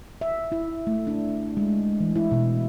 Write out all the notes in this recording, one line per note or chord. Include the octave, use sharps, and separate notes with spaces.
E5
E4
A3
D4
G#3
E3
E4
B2